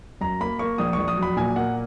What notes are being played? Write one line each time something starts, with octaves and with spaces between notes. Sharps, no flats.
F#2 A#5
A#3 B5
A#3 C#6
A#1 D#6
C#6
A#1
D#6
F#3 B5
A#2 G#5
A#3 F#5